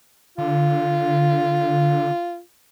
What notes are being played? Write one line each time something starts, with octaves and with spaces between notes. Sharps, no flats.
D3 F4